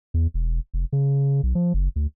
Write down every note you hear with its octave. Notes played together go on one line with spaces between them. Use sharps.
E2
E1
F1
C#3
B1
F3
F#1
D2